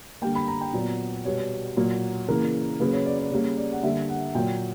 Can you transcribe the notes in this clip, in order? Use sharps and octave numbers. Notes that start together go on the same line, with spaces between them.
D3 G3 A#3 G5
B5
A#5
G5
A#2 F#3 B3 A#5
B2 G3 B3 C#5
A#2 F#3 A#3
C#3 E3 A#3 A#4
C#3 F#3 A#3 B4
C#5
D5
D5
C#3 G3 A#3 C#5
D5
F#5
D3 G3 A#3 E5
F#5
A#2 F#3 A#3 G5